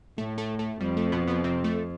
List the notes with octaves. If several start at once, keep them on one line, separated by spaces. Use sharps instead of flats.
A2 A3
A3
A3
F2 G3
A3
B2 B3
B2 B3
C3 C4
A3